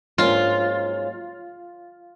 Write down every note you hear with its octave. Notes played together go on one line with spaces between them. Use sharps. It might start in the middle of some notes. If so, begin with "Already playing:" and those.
G#2 F#3 A#3 C#4 F4